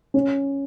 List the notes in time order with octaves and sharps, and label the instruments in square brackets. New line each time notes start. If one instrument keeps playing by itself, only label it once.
[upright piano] C#4